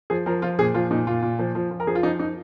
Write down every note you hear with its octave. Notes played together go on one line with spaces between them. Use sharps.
F3 G#4
F3 A#4
F3 F4
A#2 G#4
F3 F4
A#2 D#4
A#2 F4
A#2
F3
F3
F3
A#4
F3 G#4
F4
F3 D#4
D#4